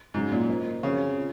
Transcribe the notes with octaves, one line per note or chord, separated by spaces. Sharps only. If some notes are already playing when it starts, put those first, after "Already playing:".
G#2 C#3 F#3 C#4
A#2
A#3 F4 C5 D#5
C#3 C4 F#4 C#5 F5
F4